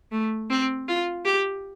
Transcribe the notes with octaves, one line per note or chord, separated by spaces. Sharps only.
A3
C4
F4
G4